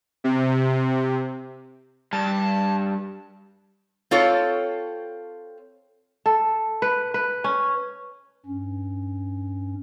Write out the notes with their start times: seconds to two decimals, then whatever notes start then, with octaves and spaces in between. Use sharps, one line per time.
0.24 C3
2.13 G2 A5
4.11 C4 F4 A4 C#5
6.26 A4
6.82 B4
7.14 B4
7.44 C#4
8.46 G2 C#4